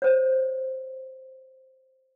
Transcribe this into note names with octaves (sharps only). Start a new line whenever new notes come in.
C5 C#5